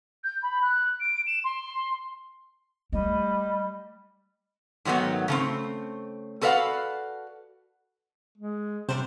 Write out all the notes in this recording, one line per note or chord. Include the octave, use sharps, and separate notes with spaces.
G6
B5
F#6
D7
E7
C6
G3 A3 D#5
G#2 D#3 F#3 A3 B3
C#3 A3 C4
F#4 A4 B4 D5 F5 F#5
G#3
C3 G3 D4 C5